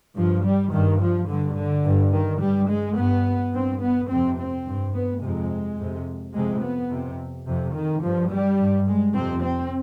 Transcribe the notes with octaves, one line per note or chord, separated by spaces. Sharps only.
G2 F3
G3
G2 D#3
F3
G2 D3
D3
G2
D#3
G2 G3
G#3
G2 B3
G2 C4
B3
F2 C3 C4
C4
G2
B3
F2 C3 G#3
F2 C3
F2 C3 G#3
B3
F2 C3
F2 C3
D#3
G2 F3
G3
G2
G#3
F2 C3 C4
C4